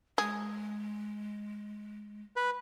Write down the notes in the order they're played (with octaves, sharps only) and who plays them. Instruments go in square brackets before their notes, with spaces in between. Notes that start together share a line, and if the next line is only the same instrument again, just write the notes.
[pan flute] G#3 [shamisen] G#4
[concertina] B4